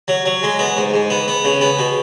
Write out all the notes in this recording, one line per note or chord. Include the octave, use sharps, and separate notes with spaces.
F#3
F#3
G#3
B3
G#2
G#2
B3
B3
C#3
B3
B2